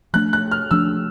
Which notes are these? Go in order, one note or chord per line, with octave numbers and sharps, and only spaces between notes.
F3 A3 D4 F#6
F#6
F6
F3 A3 D4 E6